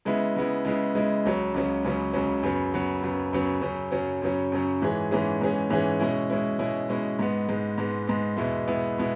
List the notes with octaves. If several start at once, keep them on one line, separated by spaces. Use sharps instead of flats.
C#3 G#3 B3 E4
C#3 G#3 B3 E4
C#3 G#3 B3 E4
C#3 G#3 B3 E4
C#2 C#3 F#3 C#4
C#2 C#3 F#3 C#4
C#2 C#3 F#3 C#4
C#2 C#3 F#3 C#4
F#2 C#3 F#3 B3
F#2 C#3 F#3 B3
F#2 C#3 F#3 B3
F#2 C#3 F#3 B3
F#2 C#3 F#3 C#4
F#2 C#3 F#3 C#4
F#2 C#3 F#3 C#4
F#2 C#3 F#3 C#4
G#2 E3 C#4 G#4
G#2 E3 C#4 G#4
G#2 E3 C#4 G#4
G#2 E3 C#4 G#4
B2 G#3 C#4 E4
B2 G#3 C#4 E4
B2 G#3 C#4 E4
B2 G#3 C#4 E4
G#2 G#3 B3
G#2 G#3 B3
G#2 G#3 B3
G#2 G#3 B3
E2 B2 G#3 B3 E4
E2 B2 G#3 B3 E4
B2 G#3 B3 E4